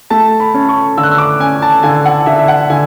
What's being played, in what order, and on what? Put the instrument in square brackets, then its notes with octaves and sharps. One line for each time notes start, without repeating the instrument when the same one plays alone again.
[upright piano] A3 A5
B5
C#4
C#6
D3 E6
F#6
E6
D6
C#4 G#5
A5
D3 G#5
F#5
D3 E5
E5
F#5
D3 G#5